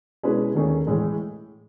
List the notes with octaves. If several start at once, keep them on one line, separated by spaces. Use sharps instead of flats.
B2 G#3 C#4 E4 B4
D#2 D#3 A3 C#4 G#4
A2 E3 G#3